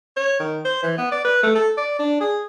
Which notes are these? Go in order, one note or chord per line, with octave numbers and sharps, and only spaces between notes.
C#5
D#3
C5
E3
B3
D5
B4
A3
A4
D5
D4
G#4